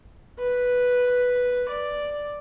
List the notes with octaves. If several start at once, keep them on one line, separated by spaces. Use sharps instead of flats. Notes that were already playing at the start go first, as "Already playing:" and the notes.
B4
D5